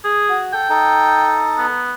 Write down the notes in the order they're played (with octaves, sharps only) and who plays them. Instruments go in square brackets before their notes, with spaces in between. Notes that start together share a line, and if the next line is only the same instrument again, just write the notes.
[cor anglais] G#4
[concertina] F#4
[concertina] A4 [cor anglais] G5
[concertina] D#4 A4
[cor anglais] B3